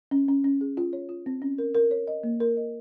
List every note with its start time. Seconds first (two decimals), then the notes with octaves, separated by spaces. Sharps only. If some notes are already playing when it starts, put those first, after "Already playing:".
0.11 C#4
0.28 C#4
0.44 C#4
0.61 G#4
0.77 F4
0.93 C#5
1.09 F4
1.26 C4
1.42 C#4
1.58 A#4
1.74 A#4
1.91 C#5
2.08 D#5
2.23 A#3
2.40 A#4
2.57 D#5